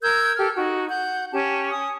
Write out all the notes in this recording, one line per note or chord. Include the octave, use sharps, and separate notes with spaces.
A#4 E6 G6 G#6
G4 A4 F6
D#4 F#4
F#5 G6
C#4 G4 A5
G#5 D#6